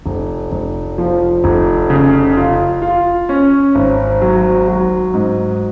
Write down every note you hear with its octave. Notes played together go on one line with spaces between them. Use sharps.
F1
F1
F3
F1
C#3
F4
F4
C#4
G#1
F#3
F#3
G#2